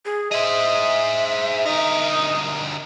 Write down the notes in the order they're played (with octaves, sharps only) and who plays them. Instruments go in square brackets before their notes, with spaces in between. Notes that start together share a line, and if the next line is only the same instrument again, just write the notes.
[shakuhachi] G#4
[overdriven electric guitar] G#4 C5 [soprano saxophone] D#5 [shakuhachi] E5
[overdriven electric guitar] D2 A#4 [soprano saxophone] D#4